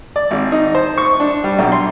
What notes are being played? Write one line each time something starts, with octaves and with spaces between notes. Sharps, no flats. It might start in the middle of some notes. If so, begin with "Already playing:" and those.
D5
G#1
D#4
C5
C#6
D4
G3
B1
C6